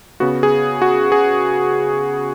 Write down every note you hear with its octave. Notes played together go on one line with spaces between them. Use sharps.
C#3 B3 F#4
G#4
F#4
G#4